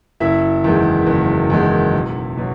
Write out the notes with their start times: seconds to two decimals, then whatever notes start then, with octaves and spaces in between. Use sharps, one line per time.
0.20 F#1 E4 E5
0.64 E2 D#3 G#3
1.06 F#1
1.50 E2 D#3 G#3
1.93 B1
2.37 B2 F#3